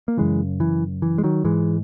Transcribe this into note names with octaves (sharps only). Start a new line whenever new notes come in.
A#3
F#2 C#3 E3 G#3
E3
E3
G#3
D#3 F#3
G#2 E3 G#3